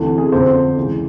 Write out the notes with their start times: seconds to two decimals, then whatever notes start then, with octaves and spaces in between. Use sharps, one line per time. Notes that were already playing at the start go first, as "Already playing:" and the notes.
Already playing: D2 C3 E3
0.18 G#4
0.32 F2 D3 C5
0.77 C#2 C#3 E3